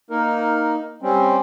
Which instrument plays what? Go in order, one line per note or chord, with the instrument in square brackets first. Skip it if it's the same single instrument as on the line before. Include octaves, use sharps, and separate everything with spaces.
[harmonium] A#3 D#4 A#4
G3 C4 C#4